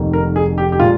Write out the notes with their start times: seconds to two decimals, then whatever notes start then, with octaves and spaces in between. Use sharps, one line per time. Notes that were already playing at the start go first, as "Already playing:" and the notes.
Already playing: F1 F2 D#3 A#3
0.13 A#4
0.36 G#4
0.58 G4
0.72 G4
0.80 A#2 G#3 F4